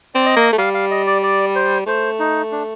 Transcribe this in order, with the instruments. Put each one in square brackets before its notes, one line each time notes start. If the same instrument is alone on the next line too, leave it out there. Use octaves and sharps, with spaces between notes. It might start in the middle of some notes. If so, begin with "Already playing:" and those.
[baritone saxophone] C4 [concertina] D5
[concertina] D#5
[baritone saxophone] A#3
A3
[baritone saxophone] G3 [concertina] F5
[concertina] F5
D#5
D5
D5
C5
[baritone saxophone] A3 [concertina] C5
[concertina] D#4
D4